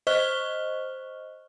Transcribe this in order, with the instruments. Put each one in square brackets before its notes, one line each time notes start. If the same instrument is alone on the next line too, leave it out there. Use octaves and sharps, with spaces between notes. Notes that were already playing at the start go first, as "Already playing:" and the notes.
[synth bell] C5 D#5 C#6 F6 F#6 G7